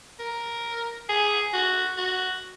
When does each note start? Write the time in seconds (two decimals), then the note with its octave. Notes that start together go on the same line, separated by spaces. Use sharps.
0.19 A#4
1.09 G#4
1.53 F#4
1.97 F#4